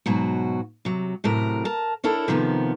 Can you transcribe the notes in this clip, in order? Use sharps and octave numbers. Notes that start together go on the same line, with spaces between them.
G#2 B2 F#3 F#4
C3 F#3
F#2 A2 C3 A#4
A#4 A5
D4 E4 A4 A#4 C#5
C3 D#3 F3 A#3 B3